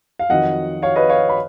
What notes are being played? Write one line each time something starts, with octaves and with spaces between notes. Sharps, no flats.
F5
F2 D#3 F#3 D#5 F#5
C#5 F5
B4 D#5
C#5 F5
B5